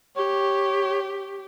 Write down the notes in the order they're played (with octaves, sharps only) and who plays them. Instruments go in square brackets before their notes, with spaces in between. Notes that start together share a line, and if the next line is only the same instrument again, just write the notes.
[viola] G4 [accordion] C#5